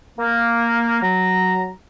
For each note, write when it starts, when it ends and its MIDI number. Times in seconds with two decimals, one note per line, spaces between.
0.19 0.99 58
1.03 1.71 54
1.03 1.71 82